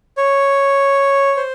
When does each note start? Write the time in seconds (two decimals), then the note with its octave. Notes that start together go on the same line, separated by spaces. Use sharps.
0.17 C#5
1.37 C5